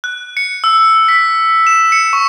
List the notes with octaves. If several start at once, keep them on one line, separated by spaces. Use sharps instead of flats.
F#6
C#7
E6
B6
E7
C#7
C#6